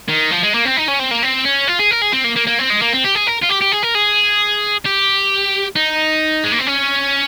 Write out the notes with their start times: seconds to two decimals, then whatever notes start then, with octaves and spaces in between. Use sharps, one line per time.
0.09 D#3
0.31 F3
0.43 G#3
0.54 A#3
0.65 C4
0.77 D#4
0.88 C#4
1.00 C4
1.11 A#3
1.23 C4
1.45 C#4
1.68 F4
1.79 G#4
1.91 A#4
2.02 G#4
2.13 C4
2.24 A#3
2.36 A#3
2.47 A#3
2.59 C4
2.70 G#3
2.82 A#3
2.93 C4
3.04 G4
3.15 G#4
3.27 A#4
3.42 F4
3.49 G4
3.61 G4
3.72 G#4
3.83 A#4
3.95 G#4
4.85 G4
5.76 D#4
6.44 G#3
6.52 A#3
6.59 C4
6.67 C#4